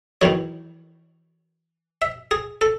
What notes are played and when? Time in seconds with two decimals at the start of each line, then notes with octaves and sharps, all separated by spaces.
0.21 E2 D#3 F#3 C#5
2.02 E5
2.31 G#4
2.61 A4